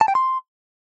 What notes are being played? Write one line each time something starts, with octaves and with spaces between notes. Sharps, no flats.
A5
G5
C6